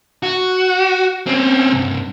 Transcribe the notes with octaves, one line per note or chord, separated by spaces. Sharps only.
F#4
C4 C#4
C2 G2